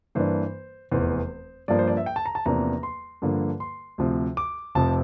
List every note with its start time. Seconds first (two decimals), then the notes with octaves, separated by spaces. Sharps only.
0.15 G2 E3 A#3 D4 C5
0.92 F1 E2 E3 C5
1.68 G2 F3 A#3 D4 D5
1.79 C5
1.88 D5
1.97 E5
2.06 G5
2.16 A5
2.26 A#5
2.35 A5
2.46 E2 C3 F3 A#3 D4 A#5
2.83 C6
3.22 G2 D3 F3 A#3
3.60 C6
3.98 D2 C3 F3
4.37 D6
4.75 F1 F2 C3 F3 C4 A5